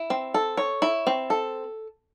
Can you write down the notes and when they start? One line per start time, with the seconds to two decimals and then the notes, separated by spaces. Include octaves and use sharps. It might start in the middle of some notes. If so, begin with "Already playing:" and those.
Already playing: E4
0.10 C4
0.34 A4
0.57 C#5
0.82 E4
1.07 C4
1.30 A4